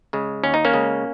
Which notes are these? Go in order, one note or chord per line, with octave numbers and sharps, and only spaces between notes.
C#3 G#3
D#2 C#4
D#4
A#3 C#4
C#3 G#3